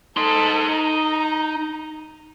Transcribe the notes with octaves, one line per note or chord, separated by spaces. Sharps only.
D#4 A4 C6
A#5